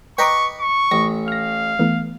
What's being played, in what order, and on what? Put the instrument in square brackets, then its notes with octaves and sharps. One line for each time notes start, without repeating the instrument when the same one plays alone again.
[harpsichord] B4 D#5 [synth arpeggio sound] G5 A#5 D6 [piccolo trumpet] C#6
[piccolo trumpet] C#6
[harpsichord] A1 [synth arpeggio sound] A#6
[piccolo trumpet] F5 [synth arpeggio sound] F6 A#6
[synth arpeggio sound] E3 A3 B3